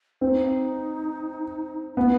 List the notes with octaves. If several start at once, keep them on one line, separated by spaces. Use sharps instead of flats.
C4 D#4
B3 E4